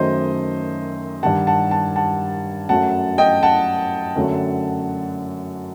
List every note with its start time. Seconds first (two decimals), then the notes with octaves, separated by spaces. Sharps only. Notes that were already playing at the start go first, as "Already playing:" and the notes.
Already playing: F#2 D#3 F#3 A3 C5 D#5
1.23 G2 D#3 G3 F#5 A5
1.47 F#5 A5
1.71 F#5 A5
1.96 F#5 A5
2.69 F#2 F#3 A3 F#5 A5
3.18 D#5 G5
3.43 F#5 A5
4.16 F#2 D3 F#3 A3